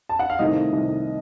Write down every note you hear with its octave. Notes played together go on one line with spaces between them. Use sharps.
A5
F#5
F5
C2 C3 D#3 A3 D#5
C2 C3 D#3 A3